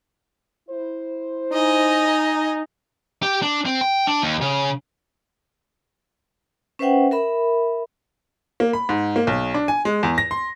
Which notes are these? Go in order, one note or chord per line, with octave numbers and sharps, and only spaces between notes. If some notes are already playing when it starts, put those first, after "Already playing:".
E4 C5
D#4 D#5 G#5
G4
D4
C4
G5
D4
D#2
C#3
C#4 B4 C5 E5 F#5 G5
A#4 E5 B5
A#3
B5
G#2
A#3
B1
D4
G#5
G#3
E2
A#6
C6